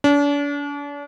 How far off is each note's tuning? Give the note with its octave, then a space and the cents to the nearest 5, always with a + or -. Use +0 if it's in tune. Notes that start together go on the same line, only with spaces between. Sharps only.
D4 -40